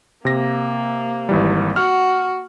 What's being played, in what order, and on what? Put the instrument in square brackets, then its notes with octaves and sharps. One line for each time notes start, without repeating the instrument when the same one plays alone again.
[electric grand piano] C3 A#6 [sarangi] A#3
[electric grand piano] G#1 E3 G3
[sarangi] F#4 [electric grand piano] F#5 F6